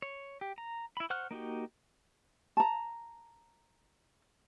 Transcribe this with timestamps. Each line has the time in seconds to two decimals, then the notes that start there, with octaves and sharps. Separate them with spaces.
0.02 C#5
0.41 G4
0.58 A#5
0.97 E4 B5
1.10 C5 F#5 C#6 F6 F#6
1.31 A#3 D#4 F#4 G4
2.57 A5 A#5